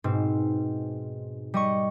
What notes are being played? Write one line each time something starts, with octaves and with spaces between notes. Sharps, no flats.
G#2 B2 C4
G3 D#5 C#6